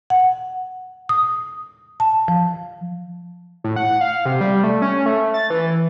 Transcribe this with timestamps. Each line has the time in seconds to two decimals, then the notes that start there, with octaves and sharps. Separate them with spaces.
0.10 F#5
1.09 D#6
2.00 A5
2.28 F3
3.64 A2
3.76 F#5
4.01 F5
4.26 C3
4.41 G3
4.63 A3
4.82 C#4
5.06 A3
5.34 A6
5.50 E3